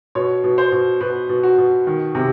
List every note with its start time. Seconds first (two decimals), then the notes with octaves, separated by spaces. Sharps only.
0.15 B2 C#5
0.44 B2
0.58 C5
0.72 B2
1.01 B2 B4
1.29 B2
1.43 F#4
1.58 B2
1.87 D#3
2.15 C3